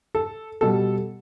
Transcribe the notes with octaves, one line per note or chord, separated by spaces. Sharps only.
A4
B2 G3 A4